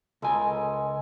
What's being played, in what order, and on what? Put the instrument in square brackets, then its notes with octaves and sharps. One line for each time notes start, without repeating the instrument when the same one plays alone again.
[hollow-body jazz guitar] C#2 G#5 [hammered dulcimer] G#3 A4 A#4